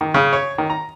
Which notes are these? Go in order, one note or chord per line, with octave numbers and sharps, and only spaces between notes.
D#3
C#3
C#5
D#3
A#5